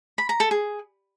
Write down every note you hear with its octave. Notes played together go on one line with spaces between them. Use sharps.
B5
A#5
A4
G#4